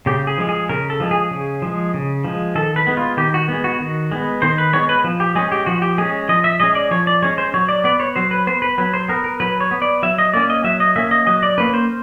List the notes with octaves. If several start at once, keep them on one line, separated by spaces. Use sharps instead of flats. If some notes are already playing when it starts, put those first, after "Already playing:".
C#3 G4
G#4
F3 G#3
G#4
C#3 A#4
A4
F3 G#3
G#4
C#3
F3 G#3
C#3
F3 G#3
D#3 A4
B4
G#3 B3
F4
D#3 G4
F#4
G#3 B3
F#4
D#3
G#3 B3
D#3 C5
B4
G#3 B3 C#5
B4
F3
G4
G#3 C#4 G#4
G4
F3 F#4
G4
G#3 C#4 G#4
F3 D#5
E5
G#3 C#4 D#5
D5
F3 C#5
D5
G#3 C#4 C#5
C5
F#3 C#5
D5
B3 D5
C#5
F#3 C5
B4
B3 C5
B4
F#3 B4
C5
B3 A#4
A#4
F#3 B4
C#5
B3
D5
F#3 E5
D#5
A#3 C#4 D5
D#5
F#3 E5
D#5
A#3 C#4 E5
D#5
F#3 D#5
D5
A#3 C#4 B4
C5